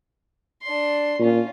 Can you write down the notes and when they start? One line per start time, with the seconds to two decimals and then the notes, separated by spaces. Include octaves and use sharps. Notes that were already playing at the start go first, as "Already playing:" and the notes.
0.63 D4 C6
1.19 A#2 C#4 F4